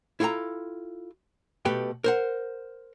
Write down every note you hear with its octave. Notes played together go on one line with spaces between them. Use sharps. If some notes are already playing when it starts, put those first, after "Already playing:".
E4 F4 A4 G5 A#5
B2 A3 G4 B4 G5
A#4 C5 F#5